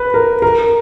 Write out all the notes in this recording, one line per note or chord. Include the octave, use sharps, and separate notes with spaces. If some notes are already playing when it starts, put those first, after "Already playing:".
Already playing: B4
A#4
A#4